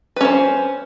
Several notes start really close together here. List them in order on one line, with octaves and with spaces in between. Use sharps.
B4 C#4 C5